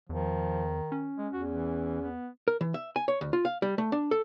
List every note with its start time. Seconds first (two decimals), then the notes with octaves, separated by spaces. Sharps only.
0.09 E2 D#3 F3
0.92 C#4
1.18 G#3
1.33 E2 F#4
1.48 E3
2.02 B3
2.48 A#4
2.61 E3
2.74 E5
2.96 G#5
3.08 C#5
3.21 D2
3.33 F4
3.45 F5
3.62 G3
3.78 A3
3.92 D4
4.11 A4